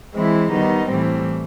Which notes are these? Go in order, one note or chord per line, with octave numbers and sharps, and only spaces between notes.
E3 G#3 C4 E4
D#3 G3 B3 D#4
A2 E3 G3 C4